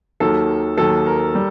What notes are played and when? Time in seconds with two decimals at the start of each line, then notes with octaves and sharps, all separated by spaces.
0.20 D#2 D#3 F#3 A4
0.77 D#2 D#3 F#3 A4
1.06 A#4
1.35 G3